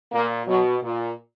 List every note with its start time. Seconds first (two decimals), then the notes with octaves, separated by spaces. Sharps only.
0.12 A#2 A#3
0.47 B2 F#3
0.83 A#2